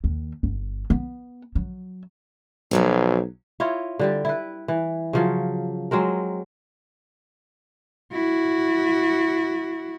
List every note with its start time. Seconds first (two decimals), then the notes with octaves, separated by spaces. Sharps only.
0.04 D#2
0.43 G1
0.90 B3
1.55 F#3
2.71 B1 F3 F#3 C4
3.60 E4 F4 C#5 D#5
3.99 D3 G3 G4
4.25 E4 B4
4.68 E3
5.13 C#3 F3 F#3
5.91 F#3 G#3 C4 A#4
8.13 E4 F#4